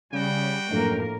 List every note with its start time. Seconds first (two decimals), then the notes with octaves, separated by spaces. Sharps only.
0.13 C#3 G3 F#4 G5
0.71 A#1 F#2 A2 A3 A#3 A#4